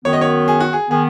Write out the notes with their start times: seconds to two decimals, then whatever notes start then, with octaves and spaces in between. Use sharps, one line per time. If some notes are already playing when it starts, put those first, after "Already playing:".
0.05 F#2 D#3 B3 C#5
0.13 D#5
0.21 C#5
0.48 G#4
0.60 F#4
0.73 G#4
0.90 D#3 B3 G#4